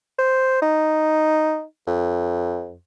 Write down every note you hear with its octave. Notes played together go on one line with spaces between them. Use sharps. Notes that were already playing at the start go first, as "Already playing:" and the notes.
C5
D#4
F2